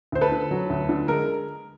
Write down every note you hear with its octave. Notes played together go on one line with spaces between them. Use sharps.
D2 C5
A4 B4
D3
F#3
D2
D3
G#3 A#4